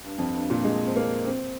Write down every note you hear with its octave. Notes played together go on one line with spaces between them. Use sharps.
G2
F2
G2
A#2
G#3
C4
A#3
C4